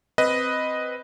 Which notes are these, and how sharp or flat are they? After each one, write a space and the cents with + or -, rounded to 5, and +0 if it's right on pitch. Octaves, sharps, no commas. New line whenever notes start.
C4 +0 B4 +0 D#5 +0